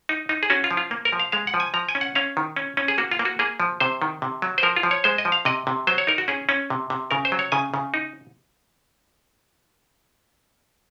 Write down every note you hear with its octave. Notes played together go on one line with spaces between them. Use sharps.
D#4
D#4
G#4
C#4 F#4
F4
F3
F4
A#3
A#4
F3
F5
G#3 F5
F#5
F3
G#5
F3 A#5
G#5
C#4
F#5
C#4 F5
D#3
C#4
C#4
G#4
A#3 F#4
F4
A#3
F#4
A#3 G#4
F3
C3 C5
D#3
C3
F#3
C5
F3 A#4
F4
F3
C#5
G#3 C5
D#5
F3
F5
C3 D#5
C3
F#3 C5
C#5
D#4 A#4
F#4
C#4 G#4
C#4
C3
C3
C#3 A#4
C5
F#3
C#5
C#3 G#5
C#3
D#4